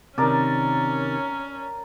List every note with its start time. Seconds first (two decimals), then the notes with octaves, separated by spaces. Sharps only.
0.18 C3 D#3 C#4 A#4 D5 A5